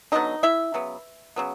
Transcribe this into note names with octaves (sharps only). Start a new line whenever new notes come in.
D3 F#3 B3 D#4 D#5
E4 E5
C#3 F#3 B3
C#3 F#3 B3